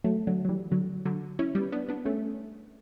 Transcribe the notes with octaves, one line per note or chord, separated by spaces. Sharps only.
F#3 A3
D3 F#3
F#3
E3 G3
D3 F#3
D3 F#3
C#4 E4
G3 B3
B3 D4
B3 D4
A3 C#4